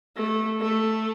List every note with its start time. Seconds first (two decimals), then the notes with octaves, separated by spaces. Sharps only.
0.16 A3
0.60 A3